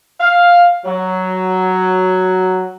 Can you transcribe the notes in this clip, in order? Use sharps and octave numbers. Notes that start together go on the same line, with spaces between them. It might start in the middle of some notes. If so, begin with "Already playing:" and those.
F5
F#3